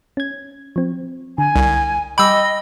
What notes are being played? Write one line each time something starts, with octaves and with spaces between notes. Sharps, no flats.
C#4 G#6
F3 C4
D3 G#5
C2
G3 D#5 G5 B5 D6 E6